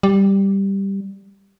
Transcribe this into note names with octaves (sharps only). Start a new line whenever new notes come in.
G3